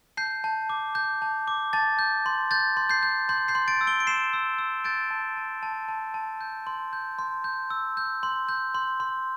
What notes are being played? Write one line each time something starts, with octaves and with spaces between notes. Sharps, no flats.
A5 G6 C7
A5
D6
G6
A5
D6
A5 A6
G6
C6
G6 A6
C6
G6 C7
G6
C6 G6
G6 C7
C6
A6 D7
E6
D7 G7
D7
C6 C7 E7
E6
E6
G6 A6 D7
A5
A5
A5
A5
A5
G6
C6
G6
C6
G6
E6
G6
C6
G6
C6
C6